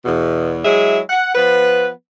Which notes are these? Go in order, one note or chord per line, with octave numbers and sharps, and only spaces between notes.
E2 B2
F#3 G#3 E4 G#4 E5
F#5
F3 B3 B4